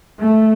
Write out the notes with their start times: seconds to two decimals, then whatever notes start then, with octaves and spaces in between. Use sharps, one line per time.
0.20 A3